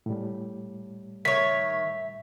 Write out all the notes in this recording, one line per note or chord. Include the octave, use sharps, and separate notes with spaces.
A2 G3
D#3 C#5 E5 B6